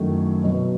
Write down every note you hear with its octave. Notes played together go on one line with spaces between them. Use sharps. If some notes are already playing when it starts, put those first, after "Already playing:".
Already playing: F#2 D#3 F#3 A3 E4
B2 F#3 B3